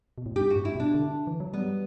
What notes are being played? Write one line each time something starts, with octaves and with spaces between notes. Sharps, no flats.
B2
A2
G2 G4
F#4
A2
E4
B2 D4
D3
E3
F#3
G3 B3